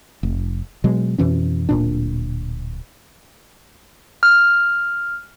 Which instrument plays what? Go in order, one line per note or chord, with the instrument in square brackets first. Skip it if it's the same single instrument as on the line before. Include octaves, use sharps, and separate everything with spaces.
[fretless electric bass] F1
B2 F#3 G#3
F2 B2 E3 C#4
D1 A#2 D4
[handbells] F6